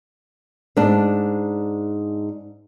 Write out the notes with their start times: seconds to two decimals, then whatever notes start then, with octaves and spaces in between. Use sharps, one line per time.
0.77 G#2 D4